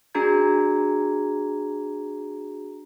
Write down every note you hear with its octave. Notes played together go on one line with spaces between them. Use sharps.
D4 F#4 G#4 A#5 G#6